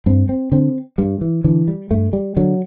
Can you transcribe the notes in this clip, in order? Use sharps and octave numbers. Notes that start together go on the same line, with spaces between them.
G2 C4
C4
D3 C4
G2 G3
E3
D3 E3
G3
G2 A3
G3
D3 F#3